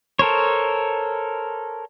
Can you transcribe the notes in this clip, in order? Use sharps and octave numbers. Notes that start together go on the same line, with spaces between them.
A4 A#4 C5 C#5